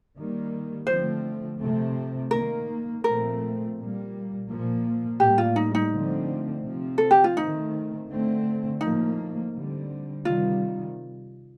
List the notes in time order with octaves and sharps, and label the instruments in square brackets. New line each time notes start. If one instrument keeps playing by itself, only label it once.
[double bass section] D#3 G3 A#3
[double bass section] D3 F3 A3 C4 [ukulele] C5
[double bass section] C3 F3 A3 C4
[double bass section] D#3 A#3 [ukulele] A#4
[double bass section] A#2 F3 A3 C4 [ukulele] A#4
[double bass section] A#2 G3 A#3
A#2 F3 A#3
[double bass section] A2 G3 A#3 [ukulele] G4
[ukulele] F4
D#4
D#4
[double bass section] D3 F3 A3 C4
C3 F3 C4
[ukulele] A4
G4
F4
[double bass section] D#3 A3 C4 [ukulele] D#4
[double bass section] D3 A3 C4
[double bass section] A2 F3 A#3 [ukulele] D#4
[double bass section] D3 G3 C4
[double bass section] C3 D#3 G3 [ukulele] F4